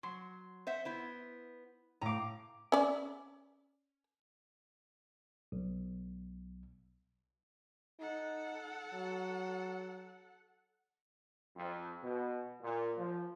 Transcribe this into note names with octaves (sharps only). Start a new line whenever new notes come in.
F#3 C6
C5 E5 F#5
B3 E4 C5
A2 F5 A#5 D6
C#4 D5
B1
D#4 A4 F#5
F#3
F2
B2
A#2
F3